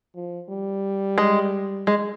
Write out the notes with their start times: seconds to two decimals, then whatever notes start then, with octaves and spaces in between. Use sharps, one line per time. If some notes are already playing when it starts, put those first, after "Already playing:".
0.16 F3
0.49 G3
1.18 G#3
1.87 G#3